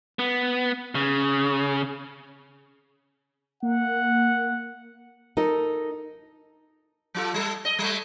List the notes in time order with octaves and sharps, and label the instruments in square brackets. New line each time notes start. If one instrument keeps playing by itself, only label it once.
[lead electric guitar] B3
C#3
[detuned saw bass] A#3 [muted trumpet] F#5
[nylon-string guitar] D#4 A4 A#4 D#5
[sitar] F#3 F4 A4
G3 A4
D#5
G3 A3